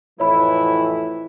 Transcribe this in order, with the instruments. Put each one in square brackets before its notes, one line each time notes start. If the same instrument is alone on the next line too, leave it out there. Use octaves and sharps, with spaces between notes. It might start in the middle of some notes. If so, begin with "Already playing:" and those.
[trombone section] F2 A2 E3 [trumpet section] E4 [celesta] C#5 B5